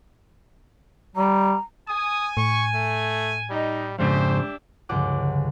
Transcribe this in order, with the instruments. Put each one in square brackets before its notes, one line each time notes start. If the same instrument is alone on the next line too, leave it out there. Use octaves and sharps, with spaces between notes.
[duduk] G3 [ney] A#5
[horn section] G#5 [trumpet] D#6
[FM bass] A2 [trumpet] C#6
[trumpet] A3
[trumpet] G3 [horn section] D#4
[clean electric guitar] F2 G#2 C#3 [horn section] D4 G4 E5 [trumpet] C5
[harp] F1 C#2 G2 D3 F#5 D6